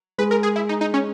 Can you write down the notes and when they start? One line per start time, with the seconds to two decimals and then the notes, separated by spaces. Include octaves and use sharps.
0.18 G#3 B4
0.31 A#4
0.43 G#4
0.56 E4
0.69 D#4
0.81 D#4
0.94 C#4